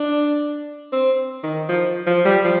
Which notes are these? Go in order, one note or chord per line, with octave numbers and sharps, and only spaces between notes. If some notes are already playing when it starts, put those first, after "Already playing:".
Already playing: D4
C4
D#3
F3
F3
G3
F3